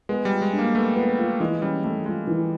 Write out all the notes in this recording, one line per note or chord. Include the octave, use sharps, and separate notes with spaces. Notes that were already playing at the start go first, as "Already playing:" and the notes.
G#3 B3
G3
F4
G#3
D4
A#3
A3 B3
B3
F4
E3 G#3
G3 C#4
G3 A3
G#3 F4
E3